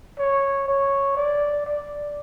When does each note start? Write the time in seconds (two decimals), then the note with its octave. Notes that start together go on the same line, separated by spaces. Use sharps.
0.19 C#5
0.68 C#5
1.17 D5
1.66 D5